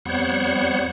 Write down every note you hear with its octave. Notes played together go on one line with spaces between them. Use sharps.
F2 G3 B3 C5 C#5 F#5